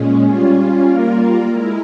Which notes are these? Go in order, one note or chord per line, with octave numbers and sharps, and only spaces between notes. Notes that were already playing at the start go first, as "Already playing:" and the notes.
Already playing: A#2 G#3 C#4
G3 C#4 F4
G3 A#3 F4 A#4
G#3 E4 A#4